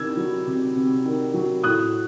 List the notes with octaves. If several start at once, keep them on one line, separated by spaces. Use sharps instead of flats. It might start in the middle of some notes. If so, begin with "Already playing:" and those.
Already playing: C3 D#3 E6 G#6
F#3
C3
C3
D#3
F#3
A2 D#6 F#6